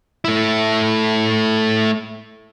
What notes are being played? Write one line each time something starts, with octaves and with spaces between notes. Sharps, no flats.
A3 E4